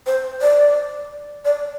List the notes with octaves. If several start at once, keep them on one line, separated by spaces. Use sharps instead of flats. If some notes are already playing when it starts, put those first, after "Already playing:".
C5
D5
D5